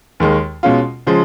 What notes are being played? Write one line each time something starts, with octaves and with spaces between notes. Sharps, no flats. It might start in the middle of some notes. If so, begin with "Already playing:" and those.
D#2 D#3 G#3
B2 G#3 C#4 F4
C#3 F3 G#3